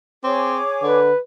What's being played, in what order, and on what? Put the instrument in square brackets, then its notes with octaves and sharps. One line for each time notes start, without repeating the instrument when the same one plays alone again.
[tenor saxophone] C4 [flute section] G#4 C#5 D6
[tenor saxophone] D3 [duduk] B4